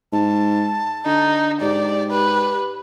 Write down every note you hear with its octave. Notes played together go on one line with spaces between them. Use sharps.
G#2 A5
D3 D#4
G#2 G4 D5
B4